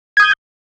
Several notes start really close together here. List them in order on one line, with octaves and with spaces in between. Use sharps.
G#6 D#6 G6